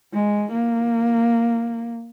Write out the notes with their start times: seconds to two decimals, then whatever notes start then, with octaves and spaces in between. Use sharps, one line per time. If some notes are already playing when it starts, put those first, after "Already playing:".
0.13 G#3
0.51 A#3